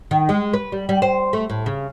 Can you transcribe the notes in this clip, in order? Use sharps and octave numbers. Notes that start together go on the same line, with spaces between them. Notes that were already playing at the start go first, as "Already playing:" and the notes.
D#3
G#3
B4
G3
G3
C5
A3
A2
C#3